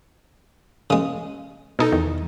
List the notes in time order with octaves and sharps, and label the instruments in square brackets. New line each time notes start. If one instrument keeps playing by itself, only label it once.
[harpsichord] C#3 G#3 [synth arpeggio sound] D#6
[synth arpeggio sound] B2 D#4 A4
E2 D#3